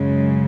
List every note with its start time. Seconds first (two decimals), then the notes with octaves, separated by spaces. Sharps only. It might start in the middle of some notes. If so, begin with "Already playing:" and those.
Already playing: F#2 C#3 G#3